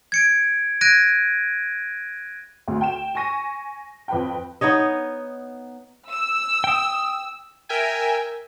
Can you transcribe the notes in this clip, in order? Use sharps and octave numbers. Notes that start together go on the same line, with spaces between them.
G#6 C#7 D7
F#6 G#6 A#6 D7 D#7
D2
G5 E7
G#5 C#6 A#6 D#7
F2 B4 G5
B3 D#4 C#5 D#5
E6
G5 D#6
A#4 E5 G5 G#5